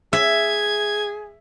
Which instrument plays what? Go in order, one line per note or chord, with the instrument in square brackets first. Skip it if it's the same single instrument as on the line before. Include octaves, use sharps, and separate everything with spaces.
[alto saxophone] G#4 [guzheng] E5 [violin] G#6